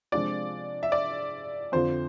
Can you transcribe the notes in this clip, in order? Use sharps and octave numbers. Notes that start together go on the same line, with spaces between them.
C3 F3 G#3 D4 F4 D5
E5
D5
F2 D3 F3 C5